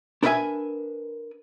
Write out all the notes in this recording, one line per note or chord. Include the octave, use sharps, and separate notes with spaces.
D4 A#4 B4 C#5 E5 G#5